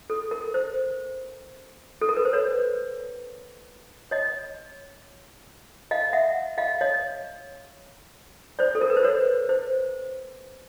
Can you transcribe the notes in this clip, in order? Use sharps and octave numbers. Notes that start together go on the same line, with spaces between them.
A4
A#4
C5
A4
A#4
B4
C5
B4 C#5
C#5 D#5
D#5 F5
E5 F#5
D#5 F5
C#5 D#5
C5 D5
A4
A#4
B4
C5
B4 C#5
C5